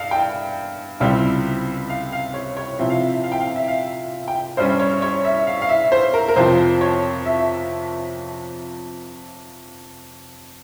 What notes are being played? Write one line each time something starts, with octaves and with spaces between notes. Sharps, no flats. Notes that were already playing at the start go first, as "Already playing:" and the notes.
Already playing: G2 F5
G5
C#2 C3 G3 C4 E4
F5
F5
C#5
C#5
C3 F3 C4 E4 E5
F5
E5
F5
G5
F5
E5
F5
G5
G2 G3 C#4 C5
C#5
C#5
E5
F5
F5
E5
C5
A#4
A#4
F2 C3 F3 C4 C5
C#5
E5